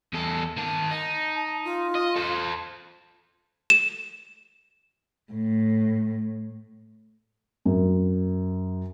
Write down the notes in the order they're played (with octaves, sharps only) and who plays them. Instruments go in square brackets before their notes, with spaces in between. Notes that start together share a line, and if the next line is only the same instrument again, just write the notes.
[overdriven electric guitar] E2 A4
D#3 A5
[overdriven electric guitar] D#4 [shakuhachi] A5
[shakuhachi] F4
[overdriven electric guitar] D#5
A4 C5
[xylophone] E7
[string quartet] A2
[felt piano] F#2